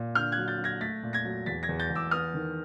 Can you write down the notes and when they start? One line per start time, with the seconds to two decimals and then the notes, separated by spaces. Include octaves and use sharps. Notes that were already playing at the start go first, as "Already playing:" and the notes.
Already playing: A#2
0.15 D3 F6 G6
0.32 F#6 G#6
0.38 F#3
0.48 G6 A6
0.59 F#3
0.64 G#6 A#6
0.81 A3 A6 B6
1.03 A#2
1.13 G#6 A#6
1.25 F#3
1.46 E2 A6 B6
1.63 G#6 A#6
1.69 E2
1.80 G6 A6
1.90 E2
1.95 D6 E6
2.11 B3 D#6 F6
2.34 D#3